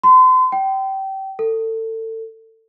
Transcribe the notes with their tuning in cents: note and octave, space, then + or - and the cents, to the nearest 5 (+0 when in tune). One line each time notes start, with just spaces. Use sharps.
C6 -40
G5 -25
A4 +25